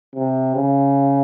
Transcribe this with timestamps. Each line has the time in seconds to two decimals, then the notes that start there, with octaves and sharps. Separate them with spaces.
0.15 C3
0.56 C#3